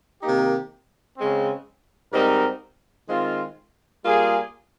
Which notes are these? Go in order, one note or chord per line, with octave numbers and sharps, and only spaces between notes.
C3 D#3 A#3 D#4 G4
C#3 G#3 C4
G#2 G3 C4 D#4 A#4
D#3 G#3 C4 F4
G3 A#3 F4 G#4